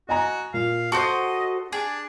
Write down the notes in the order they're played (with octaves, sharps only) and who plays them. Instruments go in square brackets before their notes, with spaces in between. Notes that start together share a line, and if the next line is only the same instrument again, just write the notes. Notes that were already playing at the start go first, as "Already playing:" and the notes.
[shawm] F#4 [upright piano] D#5 G#5 A#5
[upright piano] A#2 [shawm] F5
[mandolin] F#4 A4 C5 [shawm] D#5 [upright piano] A5
[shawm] D4 [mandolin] G#4